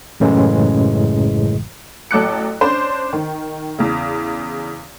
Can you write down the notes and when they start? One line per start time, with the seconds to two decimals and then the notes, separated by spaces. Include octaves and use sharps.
0.20 A1 F#2 A2 C#3 E3 G#3
2.11 A1 F#3 A4 D6 F#6 C#7
2.61 C#4 D4 C5
3.13 D#3
3.79 E2 C#3